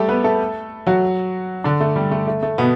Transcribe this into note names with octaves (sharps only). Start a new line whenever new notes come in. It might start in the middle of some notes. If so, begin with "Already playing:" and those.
Already playing: G3 A3 G4 A4
B3 B4
A3 A4
F#3 F#4
D3 D4
A3
G3
A3
A3
A3
B2 B3